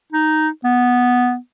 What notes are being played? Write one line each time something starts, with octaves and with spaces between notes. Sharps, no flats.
D#4
B3